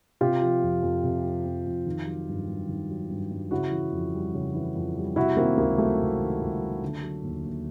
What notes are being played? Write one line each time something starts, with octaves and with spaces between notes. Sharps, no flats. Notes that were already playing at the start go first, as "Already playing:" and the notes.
C3 F4 G4
F3
F2
F2
C3
F3
F2
F2
D#3
F#3
G2
G2
D#3
F#3
G2
G2
C#3 E4 F#4
E3
F2
G3
C#3
E3
F2
G3
C3 E4 F#4
D#3 A#3 C4
C#2 A#3
F#3 A3
C3
D#3
C#2
F#3
D3
F#3
D#2
D#2